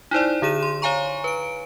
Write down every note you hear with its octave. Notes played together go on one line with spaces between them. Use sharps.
D#4 E4 C5 D5
D3 G#4 D#7 E7
C6
C#5 F5 G#5 A#5 C#6
B4 D7